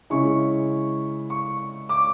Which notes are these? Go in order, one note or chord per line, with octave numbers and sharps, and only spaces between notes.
C#3 G#3 C#4 E4 C#6
C#6
D6